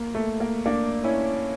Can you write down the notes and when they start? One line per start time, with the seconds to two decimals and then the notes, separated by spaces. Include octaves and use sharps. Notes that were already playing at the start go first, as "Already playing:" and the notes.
Already playing: A#3
0.15 A3
0.40 A#3
0.66 A#3 D4
1.04 C#4 E4